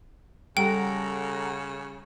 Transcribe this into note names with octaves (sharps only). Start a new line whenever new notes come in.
C#3 G3 G4 A4 F#5 G5 A#5